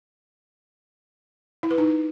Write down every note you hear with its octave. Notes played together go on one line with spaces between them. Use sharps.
E4
B4
D#4